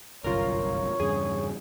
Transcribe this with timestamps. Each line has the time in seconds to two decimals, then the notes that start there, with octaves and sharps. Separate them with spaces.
0.24 G1 C2 F#2 F4 A#4 C#5
1.00 E2 G2 C#3 G#4